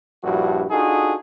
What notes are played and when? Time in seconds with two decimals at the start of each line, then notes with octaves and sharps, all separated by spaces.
0.24 A#1 G2 F3 E4 F#4
0.71 D4 D#4 F4 F#4 G#4 A4